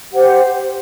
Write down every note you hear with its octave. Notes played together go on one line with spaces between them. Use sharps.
G4 C5 F#5